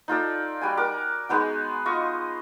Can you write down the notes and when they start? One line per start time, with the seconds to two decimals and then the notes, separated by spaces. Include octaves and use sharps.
0.08 D#4 F4 A4 D5
0.61 G3 F#4 G#5
0.77 F#4 A#4 D6
1.29 G#3 B3 D#4 F#4
1.85 F4 D#5 C#6